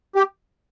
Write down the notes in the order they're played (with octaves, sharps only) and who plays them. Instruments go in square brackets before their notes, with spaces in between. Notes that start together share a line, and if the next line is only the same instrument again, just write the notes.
[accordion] G4